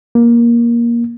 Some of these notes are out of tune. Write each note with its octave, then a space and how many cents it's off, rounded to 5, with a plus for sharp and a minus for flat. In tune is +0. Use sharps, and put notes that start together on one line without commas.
A#3 +15